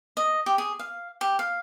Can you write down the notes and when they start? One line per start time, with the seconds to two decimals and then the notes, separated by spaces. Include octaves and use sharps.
0.17 D#5
0.46 G4
0.58 G#4
0.79 F5
1.21 G4
1.39 F5